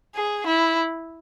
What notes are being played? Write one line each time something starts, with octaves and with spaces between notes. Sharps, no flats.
G#4
E4